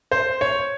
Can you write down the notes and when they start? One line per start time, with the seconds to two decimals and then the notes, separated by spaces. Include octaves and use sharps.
0.12 C5
0.41 C#5